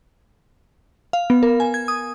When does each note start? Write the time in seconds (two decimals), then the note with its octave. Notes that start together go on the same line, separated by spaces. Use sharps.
1.13 F5
1.30 B3
1.43 A#4
1.60 G#5
1.74 G#6
1.88 D#6